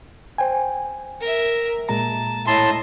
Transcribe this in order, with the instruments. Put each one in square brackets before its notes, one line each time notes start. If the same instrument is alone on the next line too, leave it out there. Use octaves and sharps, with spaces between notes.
[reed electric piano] C5 G5 G#5
[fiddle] A#4 E5
[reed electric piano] A#2 G#3 A#5 [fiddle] A5
[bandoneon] A2 A5 C6 [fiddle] D#5 E5